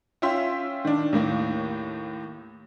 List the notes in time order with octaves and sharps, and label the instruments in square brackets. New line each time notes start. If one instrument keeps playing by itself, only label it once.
[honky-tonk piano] C#4 F4 E5 G5 C6
D#3 D4
D#2 A2 A#3